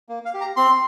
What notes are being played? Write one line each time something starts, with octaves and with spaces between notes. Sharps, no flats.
A#3
F5
G4
A#5
C4 C6